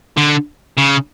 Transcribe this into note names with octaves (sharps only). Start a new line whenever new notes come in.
D3
C#3